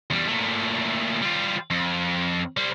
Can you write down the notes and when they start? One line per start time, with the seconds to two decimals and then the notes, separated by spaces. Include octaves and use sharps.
0.10 E2 G3
0.28 A#2 A3
1.22 G3 F4
1.71 F2
2.57 G3 C4